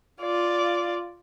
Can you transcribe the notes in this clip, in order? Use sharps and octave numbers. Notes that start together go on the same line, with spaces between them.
F4 D5